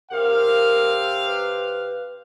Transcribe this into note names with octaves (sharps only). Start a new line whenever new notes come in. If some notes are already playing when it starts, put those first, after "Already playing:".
C3 G4 A#4 F5
B4